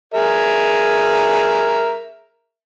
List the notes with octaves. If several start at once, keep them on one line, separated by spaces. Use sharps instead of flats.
G#4 A#4 E5